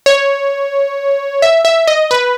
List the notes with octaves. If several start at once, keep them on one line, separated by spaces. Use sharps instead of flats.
C#5
E5
E5
D#5
B4